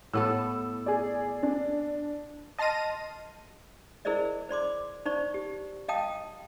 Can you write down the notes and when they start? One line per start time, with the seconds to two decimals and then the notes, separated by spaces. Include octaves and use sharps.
0.13 A2 B3 A4 E6
0.86 G#4 D5
1.43 D4
2.58 D#5 A5 C6 F6 A#6 D#7
4.05 E4 G#4 A#4 C5 D5 D#5
4.49 C5 D5 C6 D6
5.05 D#4 C5 D5 C#6
5.34 G4
5.88 D#5 F5 G5 A5 D#6